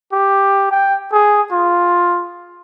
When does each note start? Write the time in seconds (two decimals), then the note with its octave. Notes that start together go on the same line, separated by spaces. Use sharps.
0.13 G4
0.71 G5
1.13 G#4
1.52 F4